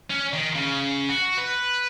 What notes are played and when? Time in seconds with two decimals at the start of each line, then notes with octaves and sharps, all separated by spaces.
0.10 C#4
0.34 D#3
0.56 C#3
1.09 F#4
1.37 B4